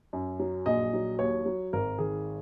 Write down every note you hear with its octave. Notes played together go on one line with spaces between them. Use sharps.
F#2
F#3
A#1 D#5
F#3
D#2 C#5
F#3
G#1 A#4
D#3 G#4